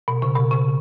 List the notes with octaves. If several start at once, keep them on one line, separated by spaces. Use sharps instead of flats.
B2
C#3
B2
C#3